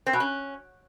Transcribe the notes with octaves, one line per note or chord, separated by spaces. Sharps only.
C4
B2
C#4